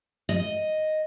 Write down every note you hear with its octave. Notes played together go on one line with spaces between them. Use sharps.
D#5